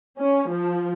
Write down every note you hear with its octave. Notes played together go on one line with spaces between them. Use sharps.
C#4
F3